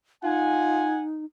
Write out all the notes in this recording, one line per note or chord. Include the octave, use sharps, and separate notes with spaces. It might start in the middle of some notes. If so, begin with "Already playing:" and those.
D#4 F4 F#5 G#5